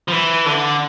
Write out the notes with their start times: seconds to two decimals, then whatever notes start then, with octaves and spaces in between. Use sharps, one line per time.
0.08 F3
0.12 E3
0.46 D3